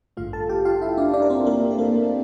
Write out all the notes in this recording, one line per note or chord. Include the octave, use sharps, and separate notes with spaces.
A1 G2 D3 A3 F4 F5
A4 A5
G4 G5
F4 F5
E4 E5
D4 D5
D4 D5
A#4
C4 C5
A#3 A#4
A4
A#3 A#4